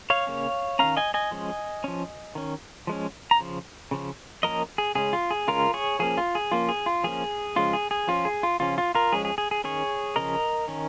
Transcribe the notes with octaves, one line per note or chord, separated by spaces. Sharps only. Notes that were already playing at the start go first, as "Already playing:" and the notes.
C#5 F5
C#3 A#3 C#4
D#3 A#3 C#4 F5 A#5
D#5 G#5
D#5 G#5
F3 G#3 C#4
F3 C#4
D#3 C#4
F3 G#3 C#4
A#5
C#3 F3
C#3 F3 C#4
F3 A#3 C#4 A#4 D#5
G#4
C#3 G#3 C#4 G#4
F4
G#4
C#3 G#3 C#4 F4 A#4
G#4 C#5
F3 A#3 C#4 G#4
F4
G#4
F3 A#3 C#4 F4
G#4
F4
F3 A#3 C#4 G#4
C#3 F3 G#3 C#4 F4
G#4
G#4
F3 C#4 F4
G#4
F4
C#3 F3 C#4 F4
F4
F4 A#4
F3 G#3 C#4 G#4
G#4
G#4
G#4
D#3 C#4 G#4 C#5
C#3 F3 C#4 A#4 D#5
D#3 C#4